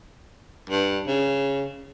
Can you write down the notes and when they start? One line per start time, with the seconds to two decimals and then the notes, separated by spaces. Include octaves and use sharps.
0.70 G2
1.07 C#3